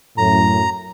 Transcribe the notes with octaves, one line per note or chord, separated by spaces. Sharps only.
F#2 A2 A#5